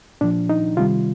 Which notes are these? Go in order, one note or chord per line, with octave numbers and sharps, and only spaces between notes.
A#2 F3 D4
D#4
C3 D#3 G3 F4